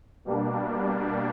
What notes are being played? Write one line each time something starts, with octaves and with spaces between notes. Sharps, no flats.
B2 G3 A#3 D4